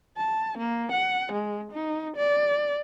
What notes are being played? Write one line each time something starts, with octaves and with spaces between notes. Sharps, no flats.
A5
A#3
F#5
G#3
D#4
D5